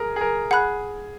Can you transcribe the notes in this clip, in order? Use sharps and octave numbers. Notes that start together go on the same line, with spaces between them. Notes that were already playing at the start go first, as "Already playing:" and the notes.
Already playing: G#4 A#4
G#4
A#4
G#4 F#5 B5 F#6